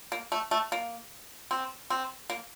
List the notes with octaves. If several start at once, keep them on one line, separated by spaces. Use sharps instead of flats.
A#3
A3
A3
A#3
C4
C4
A#3